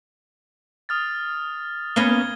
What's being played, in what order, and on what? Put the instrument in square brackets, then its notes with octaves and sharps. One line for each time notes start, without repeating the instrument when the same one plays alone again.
[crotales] D#6 F6 A6
[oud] A#3 B3 C#4 [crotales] G#6 G7